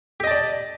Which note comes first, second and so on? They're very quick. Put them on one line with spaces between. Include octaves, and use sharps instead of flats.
G4 D#5 A5 D5